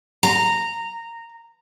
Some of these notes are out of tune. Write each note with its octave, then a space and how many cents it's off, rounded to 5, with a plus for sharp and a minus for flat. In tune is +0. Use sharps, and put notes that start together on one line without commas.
A#5 -15